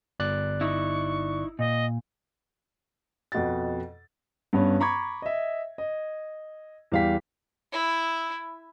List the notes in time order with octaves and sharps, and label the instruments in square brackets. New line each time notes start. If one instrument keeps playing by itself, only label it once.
[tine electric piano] G1 D5 F#6
[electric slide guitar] D#4 E4 [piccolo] C#6
[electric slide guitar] A#2 [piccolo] D#5
[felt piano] F2 B2 F#5 A6
[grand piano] G2 B3 C#4
A#5 B5 C#6 D6 G#6
D#5 E5
D#5
E2 G3 F5 G5 B6
[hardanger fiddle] E4